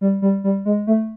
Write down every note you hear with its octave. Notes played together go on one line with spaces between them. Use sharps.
G3
G3
G3
G#3
A3